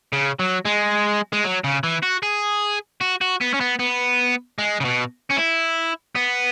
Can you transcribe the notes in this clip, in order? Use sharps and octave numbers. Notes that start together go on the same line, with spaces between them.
C#3
F#3
G#3
G#3
F#3
C#3
E3
F#4
G#4
F#4
F#4
B3
C#4
B3
B3
G#3
C#3
B2
C#4
E4
B3